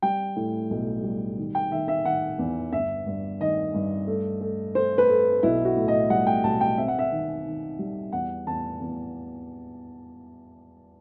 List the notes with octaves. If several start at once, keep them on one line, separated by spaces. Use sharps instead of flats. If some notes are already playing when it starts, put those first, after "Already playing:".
G3 G5
A2
B1
G3
D#3
G5
D#3 E5
E5
D#3 F#5
E2
G1 E5
G2
D#3 D#5
G2
A3
A3
A3 C5
B4
A3
B1 E4
F#4
A2
D#5
G3 F#5
G5
B1 A5
G5
C4 E5
F#5
E5
D#3
D#3
G3
E2 F#5
E2 A5
E2